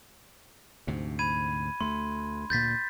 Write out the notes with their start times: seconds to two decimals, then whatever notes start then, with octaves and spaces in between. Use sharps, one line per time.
0.87 D2 G#2 C3
1.19 B5 G#6 D#7
1.81 D2 A3 C6
2.50 D2 A#2 G6 A6 B6